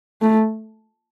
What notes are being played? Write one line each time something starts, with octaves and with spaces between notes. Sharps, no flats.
A3